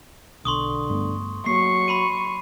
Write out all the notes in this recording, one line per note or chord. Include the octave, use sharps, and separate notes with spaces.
B1 D3 C6 C#6 D#6
G2 A3 B3
F#3 A#3 C#6 C7
B5 C6 D#7